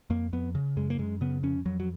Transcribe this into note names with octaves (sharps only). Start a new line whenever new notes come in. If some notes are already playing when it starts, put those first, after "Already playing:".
F2 A#3
F2 B3
C#3
F#2 G#3
A#3
F#2 G#3
C#3 B3
F2 C#4
F2 F#3
F#3